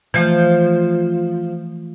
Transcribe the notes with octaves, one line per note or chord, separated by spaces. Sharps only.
E3 F3 A3